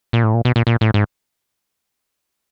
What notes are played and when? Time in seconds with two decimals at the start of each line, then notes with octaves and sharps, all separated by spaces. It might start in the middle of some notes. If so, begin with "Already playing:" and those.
0.13 A#2
0.24 A2
0.34 A#2
0.45 B2
0.56 A#2
0.67 A#2
0.81 A2
0.94 G#2